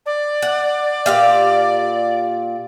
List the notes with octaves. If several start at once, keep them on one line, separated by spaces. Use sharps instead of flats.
D5
F#5
A#2 G4 F5